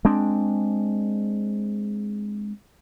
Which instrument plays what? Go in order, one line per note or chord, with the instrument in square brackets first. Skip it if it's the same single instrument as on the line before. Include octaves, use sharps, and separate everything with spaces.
[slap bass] G#3 C4 D4